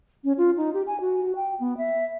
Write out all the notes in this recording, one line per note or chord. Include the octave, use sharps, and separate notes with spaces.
C#4
F4
D#4
G4
G#5
F#4
G5
B3
E5